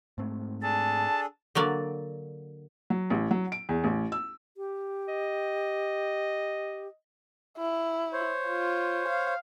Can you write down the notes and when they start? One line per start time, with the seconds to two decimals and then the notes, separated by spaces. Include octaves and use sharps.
0.18 G#2 A3 C4
0.63 D4 G#4 A4 A5
1.55 D3 F#3 A#3 D5
2.90 F#3
3.10 A1
3.31 F#3
3.52 D7
3.69 E2
3.84 A1
4.12 E6
4.57 G4
5.08 D#5
7.58 E4
8.13 C5 C#5
8.48 F4
9.09 F5